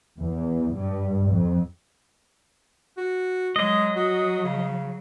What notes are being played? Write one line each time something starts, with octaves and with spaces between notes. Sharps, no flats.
E2
G2
F2
F#4
F#3 G#3 D#5
F#4
C#3